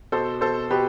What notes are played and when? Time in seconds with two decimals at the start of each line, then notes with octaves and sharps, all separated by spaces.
0.12 B2 A4 C5
0.41 B2 A4 C5
0.70 B2 G4 B4